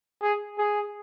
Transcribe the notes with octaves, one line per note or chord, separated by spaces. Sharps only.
G#4
G#4